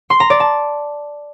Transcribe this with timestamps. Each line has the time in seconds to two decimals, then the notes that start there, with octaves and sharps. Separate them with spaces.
0.10 C6
0.20 A#5
0.30 D5
0.40 A5